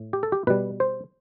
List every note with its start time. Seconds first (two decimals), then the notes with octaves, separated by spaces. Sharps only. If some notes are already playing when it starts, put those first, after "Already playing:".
Already playing: A2
0.13 G4
0.23 A4
0.32 G4
0.47 B2 G3 B4
0.80 C5